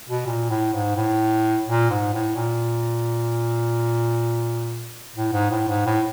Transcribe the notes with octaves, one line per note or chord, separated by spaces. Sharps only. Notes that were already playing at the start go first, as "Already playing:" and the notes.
B2
A#2
A2
G#2
A2
A#2
G#2
A2
A#2
A2
G#2
A2
G#2
A2